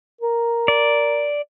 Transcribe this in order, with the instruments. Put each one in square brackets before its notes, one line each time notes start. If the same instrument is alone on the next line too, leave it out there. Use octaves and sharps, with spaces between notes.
[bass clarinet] A#4
[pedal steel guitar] D5